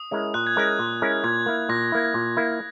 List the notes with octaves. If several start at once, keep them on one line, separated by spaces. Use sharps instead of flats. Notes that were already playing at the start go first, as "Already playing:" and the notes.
Already playing: D#6
G#3 C#4 E4 A#4
A#2 F#6
G#6
G#3 C#4 E4 A#4 F#6
A#2
G#3 C#4 E4 A#4
A#2 G#6
A#3 E4
A#2 A#6
A#3 E4
A#2
A#3 E4